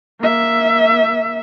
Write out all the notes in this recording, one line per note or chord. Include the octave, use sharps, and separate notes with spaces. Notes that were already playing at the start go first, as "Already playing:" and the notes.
A#3 E5